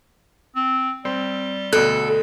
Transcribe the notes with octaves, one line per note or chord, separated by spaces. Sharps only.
C4
G3 C4
D2 B2 A4 F#6